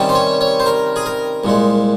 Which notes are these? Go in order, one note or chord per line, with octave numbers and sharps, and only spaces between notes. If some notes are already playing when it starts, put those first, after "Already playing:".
Already playing: C3 D#3 G3 C#4
C5
C#5
C#5
C5
A#4
G#4
A#4
C2 A#2 G#3